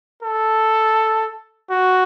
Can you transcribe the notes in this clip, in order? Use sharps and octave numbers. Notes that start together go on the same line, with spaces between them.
A4
F#4